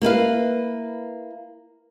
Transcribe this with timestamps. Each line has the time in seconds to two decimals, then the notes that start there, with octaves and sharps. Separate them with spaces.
0.02 A#3 E4 B4 F5